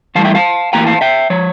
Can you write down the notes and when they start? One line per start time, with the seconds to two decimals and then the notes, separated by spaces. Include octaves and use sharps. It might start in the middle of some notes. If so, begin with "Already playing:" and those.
0.15 A2 E3 G3 F5 A5
0.25 E5 G5
0.35 F5 A5
0.73 A2 E3 A#3 G5 A#5
0.87 F5 A5
1.01 E5 G5
1.30 F3 C#5